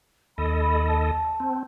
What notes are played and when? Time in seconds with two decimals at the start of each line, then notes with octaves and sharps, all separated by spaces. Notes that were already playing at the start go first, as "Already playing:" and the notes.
0.38 D#2 A4 D#5 B5
0.61 B5
0.88 A5
1.40 C4